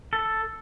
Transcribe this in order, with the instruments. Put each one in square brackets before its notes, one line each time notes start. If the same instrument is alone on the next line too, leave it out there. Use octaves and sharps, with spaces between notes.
[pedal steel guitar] A4